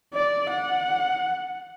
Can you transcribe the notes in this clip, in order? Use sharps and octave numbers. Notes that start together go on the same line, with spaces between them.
D5
F#5